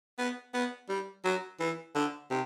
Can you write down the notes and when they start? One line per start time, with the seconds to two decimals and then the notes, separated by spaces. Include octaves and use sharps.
0.18 B3
0.54 B3
0.89 G3
1.24 F#3
1.60 E3
1.95 D3
2.31 C3